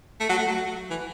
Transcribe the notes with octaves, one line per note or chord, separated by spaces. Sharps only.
A3
F#3
A3
F#3
E3